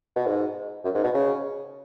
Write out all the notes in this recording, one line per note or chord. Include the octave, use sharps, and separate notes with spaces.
B2
G#2
F#2
G#2
B2
C#3